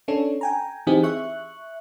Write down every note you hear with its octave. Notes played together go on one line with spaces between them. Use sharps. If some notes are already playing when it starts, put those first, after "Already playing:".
C#4 D4 A4 C#5
G5 G#5 A#5
E3 C4 D#4 G4 G#4
E5 C#6 F#6